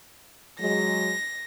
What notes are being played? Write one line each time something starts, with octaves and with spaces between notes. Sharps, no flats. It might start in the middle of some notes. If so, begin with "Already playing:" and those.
F#3 G#3 A#6